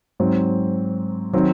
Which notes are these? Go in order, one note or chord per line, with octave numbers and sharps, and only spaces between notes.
G#2 F#3 C4
D#3 F#3 C4